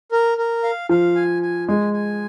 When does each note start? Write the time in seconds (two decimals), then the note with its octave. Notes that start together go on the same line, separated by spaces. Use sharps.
0.12 A#4
0.38 A#4
0.63 F5
0.89 F3 F5
1.16 G#5
1.42 G#5
1.68 G#3 G#5
1.93 G#5